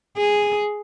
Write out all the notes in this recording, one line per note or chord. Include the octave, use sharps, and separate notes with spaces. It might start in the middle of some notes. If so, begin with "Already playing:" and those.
G#4